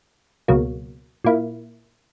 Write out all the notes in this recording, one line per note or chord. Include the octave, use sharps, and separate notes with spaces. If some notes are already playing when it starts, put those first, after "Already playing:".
C#2 B2 F#3 A#3
A#2 A#3 E4